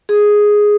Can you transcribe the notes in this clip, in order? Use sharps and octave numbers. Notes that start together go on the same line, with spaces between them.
G#4